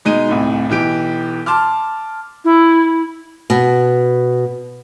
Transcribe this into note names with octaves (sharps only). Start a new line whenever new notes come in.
B2 G#3 D#4 D#7
D1 C2 A2
B1 E3 G4 D7
A5 C6 D6 F6
E4
B2